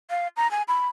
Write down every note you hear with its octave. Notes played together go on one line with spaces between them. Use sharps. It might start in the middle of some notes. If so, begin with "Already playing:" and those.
F5
A#5
G#5
B5